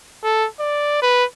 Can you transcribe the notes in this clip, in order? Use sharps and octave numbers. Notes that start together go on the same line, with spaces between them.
A4
D5
B4